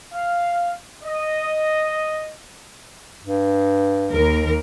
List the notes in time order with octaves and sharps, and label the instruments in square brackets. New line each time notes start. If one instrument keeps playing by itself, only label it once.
[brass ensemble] F5
D#5
[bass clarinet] G2
[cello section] D#2 A#4